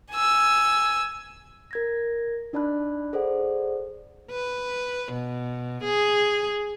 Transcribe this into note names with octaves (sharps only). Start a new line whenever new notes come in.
G#5 E6
A#4 G#6 A#6
D4 D#4 D5 A5 B5 F#6
G#4 A4 C5 D5 F#5
B4
B2
G#4